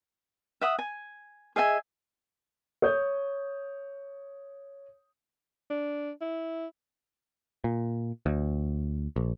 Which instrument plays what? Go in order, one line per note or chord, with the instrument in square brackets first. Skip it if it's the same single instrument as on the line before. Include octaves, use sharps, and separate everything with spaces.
[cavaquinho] E5 F#5 D#6
G#5
G#4 D#5 E5 G#5
[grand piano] C#5 D#6 G6
[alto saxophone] D4
E4
[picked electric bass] A#2
D2
A#1